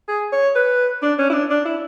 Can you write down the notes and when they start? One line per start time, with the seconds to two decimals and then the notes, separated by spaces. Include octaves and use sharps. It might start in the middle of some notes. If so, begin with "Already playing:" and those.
0.08 G#4
0.32 C#5
0.55 B4
1.02 D4
1.19 C#4
1.30 E4
1.33 D4
1.50 D4
1.65 E4